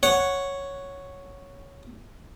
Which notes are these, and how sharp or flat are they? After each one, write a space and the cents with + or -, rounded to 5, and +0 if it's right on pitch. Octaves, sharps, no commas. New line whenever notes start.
C#5 +0 F#5 +0